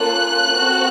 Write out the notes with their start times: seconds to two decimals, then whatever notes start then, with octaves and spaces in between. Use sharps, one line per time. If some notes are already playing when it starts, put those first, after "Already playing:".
Already playing: A#3 C#4 F4 A4 F#6
0.56 C4 F#4 A4